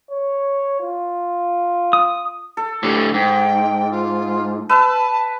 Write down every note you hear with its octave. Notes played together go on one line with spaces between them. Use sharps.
C#5
F4
D#6
A4
A2 D3 G4
G#2 G5
F4
B4 E5 A5